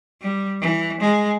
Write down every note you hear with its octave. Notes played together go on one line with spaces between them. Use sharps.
G3
E3
G#3